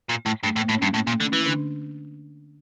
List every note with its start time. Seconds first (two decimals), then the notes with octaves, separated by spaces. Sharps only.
0.09 A#2
0.26 A2
0.43 G2 A3
0.56 A2
0.61 A#3
0.69 A2
0.78 C#4
0.82 G2
0.94 A2 A#3
1.07 A#2
1.12 A3
1.21 D3
1.28 C#4
1.33 E3
1.46 D3 D4